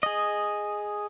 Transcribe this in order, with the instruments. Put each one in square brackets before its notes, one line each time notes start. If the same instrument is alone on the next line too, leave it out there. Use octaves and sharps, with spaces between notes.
[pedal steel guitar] G#4 D#5